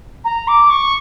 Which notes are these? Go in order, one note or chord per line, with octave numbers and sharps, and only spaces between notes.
A#5
D6
C#6